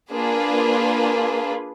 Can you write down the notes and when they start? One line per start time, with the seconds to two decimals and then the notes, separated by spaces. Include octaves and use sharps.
0.12 A#3 D4 F4 G#4 B4